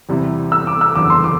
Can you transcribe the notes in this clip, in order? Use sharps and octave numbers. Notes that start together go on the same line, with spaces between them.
E2 C3 G3 C4 E4
E6
D6
E6
F#1 E2 D3 G3 B3 D6
C6
D6